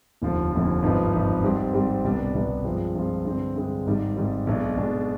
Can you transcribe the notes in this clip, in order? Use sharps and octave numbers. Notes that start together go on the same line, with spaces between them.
F1 D#2 D3 F3
F1 D#2 D3 F3
G#1 G2 F3 B3 D#4
G#1 G2 F3 B3 D#4
G#2 G3 C4 G4
G#2 G3 C4 G4
C2 B2 G3 B3 D4
C2 B2 G3 B3 D4
G2 F3 G#3 C4 F4
G2 F3 G#3 C4 F4
G2 D3 G#3 C4
G2 D3 G#3 C4
G#1 G#2 D#3 G3
G#1 G#2 D#3 G3
B1 B2 G#3 D4
B1 B2 G#3 D4